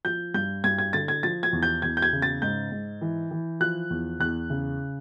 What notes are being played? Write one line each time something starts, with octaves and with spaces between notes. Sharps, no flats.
F3 G6
G2 G6
G2 G#6
G#6
D3 A6
G#6
F3 A6
G#6
E2
G6
E2 G#6
G6
G#6
C#3
A6
G#2 G6
G#2
E3
E3
F3 F#6
E2
E2 F#6
C#3